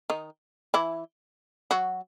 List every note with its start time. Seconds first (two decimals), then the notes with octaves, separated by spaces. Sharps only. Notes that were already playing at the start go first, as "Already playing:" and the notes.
0.10 D#3 D#4
0.74 E3 E4
1.71 F#3 F#4